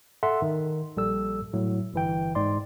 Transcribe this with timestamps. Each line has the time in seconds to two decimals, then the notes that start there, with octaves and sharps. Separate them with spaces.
0.23 A4 E5 F#5 C6
0.42 D#3
0.97 A#1 G3 A4 E6
1.53 A2 F#3
1.94 G1 E3 G5
2.35 G#2 D5 C6